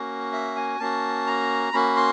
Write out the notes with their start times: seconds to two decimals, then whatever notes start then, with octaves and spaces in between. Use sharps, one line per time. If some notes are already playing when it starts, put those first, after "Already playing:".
Already playing: A#3 C#4 F#4
0.33 E5
0.56 G#5
0.79 A#3 C#4 F#4 A5
1.27 A#5
1.73 A#3 C#4 F#4 B5
1.96 C6